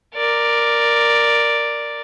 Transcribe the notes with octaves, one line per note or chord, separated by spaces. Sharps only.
A#4 D5